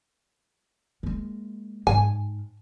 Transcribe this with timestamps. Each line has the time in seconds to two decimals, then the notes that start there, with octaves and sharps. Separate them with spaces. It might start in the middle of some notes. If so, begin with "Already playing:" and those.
1.03 G#3 A#3
1.87 G#2 G#5